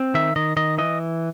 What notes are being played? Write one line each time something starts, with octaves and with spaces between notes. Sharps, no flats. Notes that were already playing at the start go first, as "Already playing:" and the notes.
Already playing: C4
D#3 E5
D#3 D#5
D#3 D#5
E3 D#5